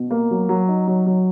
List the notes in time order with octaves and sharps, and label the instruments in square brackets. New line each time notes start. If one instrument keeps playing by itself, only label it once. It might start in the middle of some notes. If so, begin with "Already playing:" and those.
Already playing: [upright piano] B2
A#3
F#3
F#3
D#4
F#3
F#3